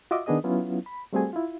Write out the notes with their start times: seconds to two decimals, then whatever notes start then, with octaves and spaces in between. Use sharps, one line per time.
0.11 F4 F#4 D#5 E5 D6
0.26 D#3 B3 D4 G#4 D#5 D#6
0.44 F#3 B3 C#4 E4 F4
0.86 B5
1.13 G3 A3 C4 F#4 G#4 G#5
1.33 E4 F4